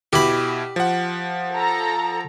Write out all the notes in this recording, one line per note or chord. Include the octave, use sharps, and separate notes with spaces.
B2 E4 G4 B5
F3 F#5
A4 A#5